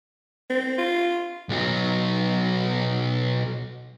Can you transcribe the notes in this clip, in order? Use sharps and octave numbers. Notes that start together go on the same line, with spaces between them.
C4
F4
B1 F#3